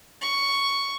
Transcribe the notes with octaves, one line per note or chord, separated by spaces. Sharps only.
C#6